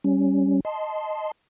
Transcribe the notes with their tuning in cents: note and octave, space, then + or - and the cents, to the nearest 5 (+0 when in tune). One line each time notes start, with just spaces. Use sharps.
G3 -10 C#4 +0
D#5 +0 A5 -10 C6 -5